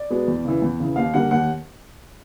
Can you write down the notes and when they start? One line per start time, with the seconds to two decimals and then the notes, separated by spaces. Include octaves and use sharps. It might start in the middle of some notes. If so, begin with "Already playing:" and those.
Already playing: D5
0.10 B2 G#3 B3
0.28 E2
0.45 C#3 E3
0.62 E2
0.80 C#3 E3
0.96 D#2 F5
1.14 D3 G3 A#3 F#5
1.31 D#2 F#5